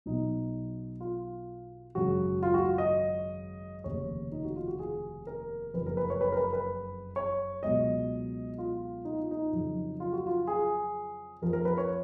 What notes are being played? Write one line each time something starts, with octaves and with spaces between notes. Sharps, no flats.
B1 B2 F#3 D#4
F4
G#1 F#2 C#3 F#3 F#4
F4
F#4
D#5
F1 D#2 C#3 C#5
D#4
F#4
F4
F#4
G#4
A#4
F#1 F2 C#3 B4
A#4
B4
C#5
B4
A#4
B4
B4
C#5
C#2 B2 F#3 D#5
F4
D#4
F4
D#4
F2 C#3 F#3
F4
F#4
F4
G#4
F2 F3 A#4
A#4
B4
C#5